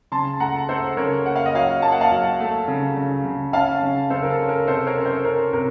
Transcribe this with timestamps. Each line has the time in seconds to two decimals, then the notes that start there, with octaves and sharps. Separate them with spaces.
0.12 C#3 A5 C6
0.40 A3 F#5 A#5
0.69 A3 A4 C5
0.97 C#3 A#4 C#5
1.25 A#3 F#5
1.36 F5
1.46 D#5
1.54 F#3 C#5 F5
1.82 A#3 A5
1.92 F#5
2.01 F5 A5
2.11 F#3
2.40 A3
2.68 C#3
2.97 C#3
3.25 C#3
3.53 C#4 F5 A5
3.83 C#3
4.10 C#3 A4 C5
4.23 A#4
4.30 A4
4.39 C#4
4.49 A#4
4.67 C3 A4 C5
4.87 A#4 C#5
4.97 C#4
5.06 A4 C5
5.25 C#4 A#4
5.53 C3 A#4